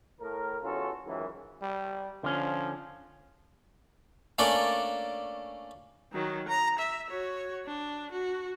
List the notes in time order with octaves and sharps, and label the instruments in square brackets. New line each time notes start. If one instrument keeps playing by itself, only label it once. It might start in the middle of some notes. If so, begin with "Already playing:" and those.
[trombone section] A2 A#4
A1 E2 C#4 F4 F#4 A4
G#1 C#2 F#2 D#3 E3
[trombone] G3
[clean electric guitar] D3 C#4 [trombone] F3
[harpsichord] A3 A#3 C#4 D4 D5
[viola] D#3 F#3
A#5
E5
F#4 C#5
D4
F#4